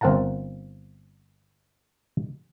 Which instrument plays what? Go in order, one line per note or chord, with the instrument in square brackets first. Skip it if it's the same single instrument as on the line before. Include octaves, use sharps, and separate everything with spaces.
[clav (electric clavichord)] G1 C4 A#4 F#5 A5 A#5